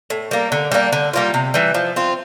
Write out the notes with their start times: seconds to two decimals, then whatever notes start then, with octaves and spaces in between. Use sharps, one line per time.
0.10 A2
0.31 G3 A#3
0.52 D3
0.72 G3 A#3 D4
0.92 D3
1.13 G3 A#3 F4
1.34 C3
1.54 E3 G3
1.74 F3
1.96 C4 F4